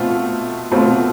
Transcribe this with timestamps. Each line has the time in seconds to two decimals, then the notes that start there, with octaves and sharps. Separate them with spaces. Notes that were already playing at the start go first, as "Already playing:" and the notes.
Already playing: B2 A3 C4 F4
0.72 B2 A3 C4 F4